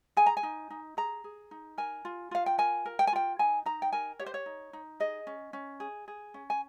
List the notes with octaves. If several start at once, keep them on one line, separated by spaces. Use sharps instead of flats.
G#4 G#5
A#5
G#5
D#4
D#4
G#4 A#5
G#4
D#4
A#4 G#5
F4
F4 F5
G5
A#4 G#5
A#4
G5
G#5
F4 G5
D#4 G#5
D#4 A#5
G5
A#4 G#5
G4 C#5
C5
C#5
D#4
D#4
G#4 D#5
C#4
C#4
G#4
G#4
C#4
G#5